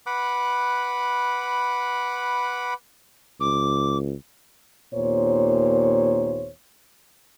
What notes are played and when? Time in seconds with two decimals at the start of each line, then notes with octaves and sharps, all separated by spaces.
0.06 B4 F#5 B5 D6
3.40 C#2 D6
4.93 D#2 A#2 B3 C5 C#5